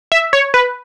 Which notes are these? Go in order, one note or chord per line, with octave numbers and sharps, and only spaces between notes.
E5
C#5
B4